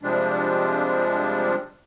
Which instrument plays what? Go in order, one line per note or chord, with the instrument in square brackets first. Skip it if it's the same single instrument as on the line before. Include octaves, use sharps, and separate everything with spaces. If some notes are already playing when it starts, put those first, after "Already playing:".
[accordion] C3 F3 G3 G#3 D4